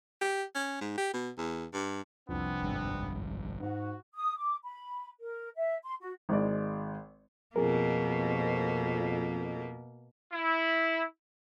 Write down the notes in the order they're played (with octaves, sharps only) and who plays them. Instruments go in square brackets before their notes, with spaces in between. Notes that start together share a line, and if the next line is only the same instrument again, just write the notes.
[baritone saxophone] G4
C#4
G#2
G4
B2
E2
G2
[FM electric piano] C2 F2 [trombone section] B3 C4 [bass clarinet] D4
[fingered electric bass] G#1 G2
[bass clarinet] G#2 [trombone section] F#4
[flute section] D#6
D6
B5
A#4
E5
C6
F#4
[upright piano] G#1 G#3 D5
[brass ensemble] F2 [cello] B2 A#3 [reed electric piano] G#4 A#4
[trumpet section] E4